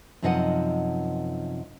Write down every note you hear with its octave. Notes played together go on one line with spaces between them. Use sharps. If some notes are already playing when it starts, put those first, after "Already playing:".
F#2 C3 F3 D#4 D#5 F#5